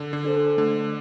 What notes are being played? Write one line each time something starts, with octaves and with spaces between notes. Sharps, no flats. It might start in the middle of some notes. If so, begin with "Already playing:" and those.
Already playing: D3
D3
D4 A4 C5
D3 A3